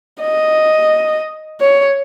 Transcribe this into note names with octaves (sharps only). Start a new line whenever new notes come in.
D#5
C#5